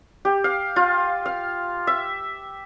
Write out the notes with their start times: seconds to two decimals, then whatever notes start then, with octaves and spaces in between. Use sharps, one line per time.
0.25 G4
0.44 F5
0.76 F4
1.26 F5
1.87 E5